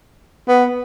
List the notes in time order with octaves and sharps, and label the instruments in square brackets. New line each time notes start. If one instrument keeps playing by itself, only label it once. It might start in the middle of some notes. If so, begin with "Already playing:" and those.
[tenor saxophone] B3